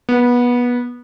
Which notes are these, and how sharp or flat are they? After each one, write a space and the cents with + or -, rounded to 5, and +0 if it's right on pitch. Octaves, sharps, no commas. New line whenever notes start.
B3 -20